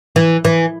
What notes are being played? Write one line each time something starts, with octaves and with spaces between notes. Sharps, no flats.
E3
E3